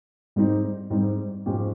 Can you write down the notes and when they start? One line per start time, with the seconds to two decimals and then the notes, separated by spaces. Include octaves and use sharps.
0.36 G#2 G3 C4 D#4
0.90 G#2 G3 C4 D#4
1.46 G#2 F3 G#3 C#4 G4